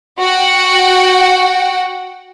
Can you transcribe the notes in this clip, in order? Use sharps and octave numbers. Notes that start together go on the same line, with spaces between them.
F#4 F#5 G5